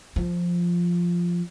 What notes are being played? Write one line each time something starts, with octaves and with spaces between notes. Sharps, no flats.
F3